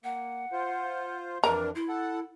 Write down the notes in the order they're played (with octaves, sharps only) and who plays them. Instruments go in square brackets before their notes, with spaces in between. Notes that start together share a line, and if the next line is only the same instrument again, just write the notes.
[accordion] A#3 [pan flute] F#5
[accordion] F4 C5
[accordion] F2 E3 D4 [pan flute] A#4 [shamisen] A#5
[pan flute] E4 [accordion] C6
[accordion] A4 F#5